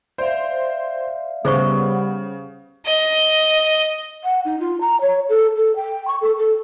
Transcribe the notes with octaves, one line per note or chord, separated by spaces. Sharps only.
C5 D5 E5 F5
C#3 G3 B3 G#4 C5 C#6
D#5
F#5
D#4
F4
A#5
C#5
A4
A4
G5
C#6
A4
A4